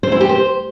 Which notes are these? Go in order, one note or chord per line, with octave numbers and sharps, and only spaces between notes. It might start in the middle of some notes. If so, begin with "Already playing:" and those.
C5
E4
G4
C5